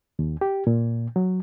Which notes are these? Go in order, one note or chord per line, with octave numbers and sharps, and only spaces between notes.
D#2
G4
A#2
F#3